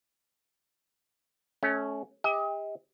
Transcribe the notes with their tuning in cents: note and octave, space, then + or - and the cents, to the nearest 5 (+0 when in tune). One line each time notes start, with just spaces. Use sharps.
A3 -30 C#4 +0
G4 +40 D#5 +35